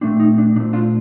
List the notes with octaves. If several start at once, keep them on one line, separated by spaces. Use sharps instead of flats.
A#2 A3 C4 D4
D#4
D4
A#2 A3 C4 D4
D4 F4